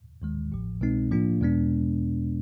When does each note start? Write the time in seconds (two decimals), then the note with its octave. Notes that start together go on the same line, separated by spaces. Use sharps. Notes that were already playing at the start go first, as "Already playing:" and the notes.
0.22 D#2 D#3 G#3
0.52 A1 A2 F3
0.81 C2 B2 G#3 C4 D#4
1.11 A2 F3 A#3 D4 F4
1.41 E2 B2 G#3 B3 D4